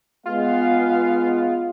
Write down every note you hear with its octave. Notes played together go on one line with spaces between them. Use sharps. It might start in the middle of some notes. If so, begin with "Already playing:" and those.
G#3 B3 F4 F5